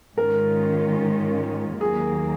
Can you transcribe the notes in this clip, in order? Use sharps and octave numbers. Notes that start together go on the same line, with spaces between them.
G#2 D#3 G#3 C#4 F4 A#4
D#2 D#3 F#3 A#3 G#4